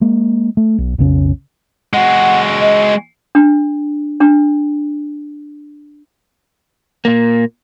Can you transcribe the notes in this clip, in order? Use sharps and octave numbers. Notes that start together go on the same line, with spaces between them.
G#3 A#3
A3
B1
B1 F2 C#3 C#4
G#3 F#4 F#5
D#5
D4
D4
A#2 A#3